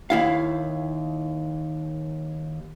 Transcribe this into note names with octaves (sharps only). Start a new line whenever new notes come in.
D#2 E4 F5